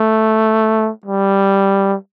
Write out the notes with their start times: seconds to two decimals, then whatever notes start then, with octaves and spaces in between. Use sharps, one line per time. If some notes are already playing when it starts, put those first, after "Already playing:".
Already playing: A3
1.05 G3